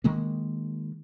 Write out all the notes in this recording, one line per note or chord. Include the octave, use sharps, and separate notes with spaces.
D#3 G#3 A#3